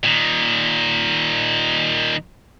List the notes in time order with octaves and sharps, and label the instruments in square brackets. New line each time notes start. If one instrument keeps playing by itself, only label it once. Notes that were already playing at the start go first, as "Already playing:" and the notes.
[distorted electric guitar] A#2 D#3